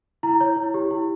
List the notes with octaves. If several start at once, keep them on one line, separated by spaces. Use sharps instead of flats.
E4 A#5
C#5
E4
G4
E4